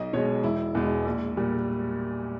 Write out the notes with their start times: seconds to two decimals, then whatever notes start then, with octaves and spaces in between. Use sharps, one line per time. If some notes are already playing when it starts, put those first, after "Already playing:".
Already playing: B1 D#5
0.13 B2 G#3 C#5
0.43 E1 E4
0.75 E2 B2 G#3
1.05 A#1
1.37 A#2 G3